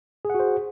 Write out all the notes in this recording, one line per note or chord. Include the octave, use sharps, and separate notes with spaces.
F#4 G#4 C5 F#5